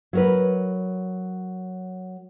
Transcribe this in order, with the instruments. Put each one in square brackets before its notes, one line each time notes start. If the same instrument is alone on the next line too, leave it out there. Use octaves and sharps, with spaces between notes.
[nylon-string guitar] F#3 A#4 B4